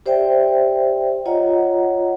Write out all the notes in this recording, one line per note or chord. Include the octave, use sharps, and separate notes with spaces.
G4 C5 D5 E5 G5
F4 C#5 D#5 F#5 A#5